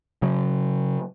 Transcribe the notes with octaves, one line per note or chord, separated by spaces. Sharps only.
C#3 F#3